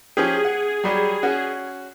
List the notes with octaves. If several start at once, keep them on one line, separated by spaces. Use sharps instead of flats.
F3 C#4 G4 G#4
F#5
F#3 G3 G4
C#4 F#4